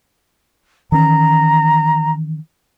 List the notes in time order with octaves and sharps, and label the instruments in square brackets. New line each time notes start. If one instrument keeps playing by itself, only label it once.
[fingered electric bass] D#3 E3 C#4 [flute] A#5